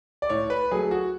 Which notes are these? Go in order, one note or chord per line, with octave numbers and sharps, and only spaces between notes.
D5
A2 C#5
B4
F#3 A3 G#4
F#4